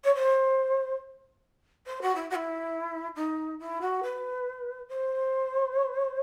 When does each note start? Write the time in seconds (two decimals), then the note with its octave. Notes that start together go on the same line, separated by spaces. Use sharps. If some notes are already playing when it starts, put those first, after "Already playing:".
0.04 C#5
0.15 C5
1.86 C5
2.02 F#4
2.15 E4
2.30 F#4
2.35 E4
3.16 D#4
3.59 E4
3.81 F#4
4.03 B4
4.89 C5